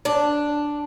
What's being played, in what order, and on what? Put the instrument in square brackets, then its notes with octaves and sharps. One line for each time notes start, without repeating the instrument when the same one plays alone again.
[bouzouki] D4